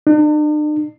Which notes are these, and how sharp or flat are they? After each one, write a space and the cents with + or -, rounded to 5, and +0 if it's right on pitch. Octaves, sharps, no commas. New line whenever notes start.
D4 +45